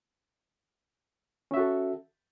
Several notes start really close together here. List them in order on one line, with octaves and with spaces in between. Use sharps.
C#4 E5 F#4 A4